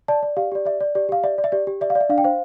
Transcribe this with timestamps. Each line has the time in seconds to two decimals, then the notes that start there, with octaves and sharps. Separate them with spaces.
0.08 D5 A5
0.23 D5
0.37 G4 F5
0.52 G4 D5
0.65 D5 E5
0.81 D5
0.95 G4 D5
1.09 G4 F5
1.24 D5 E5
1.38 D5
1.44 E5
1.52 G4 D5
1.67 G4
1.81 D5 E5
1.90 F5
1.95 D5
2.01 E5
2.09 D4 F5
2.18 G5
2.24 C5 F5